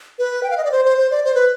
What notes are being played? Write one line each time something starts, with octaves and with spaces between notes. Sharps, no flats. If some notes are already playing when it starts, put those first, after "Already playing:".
B4
G5
F5
D#5
D5
C5
C5
C5
D5
C5
B4